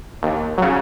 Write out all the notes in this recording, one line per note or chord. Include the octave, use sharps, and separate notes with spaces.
D#2
C#3 F#3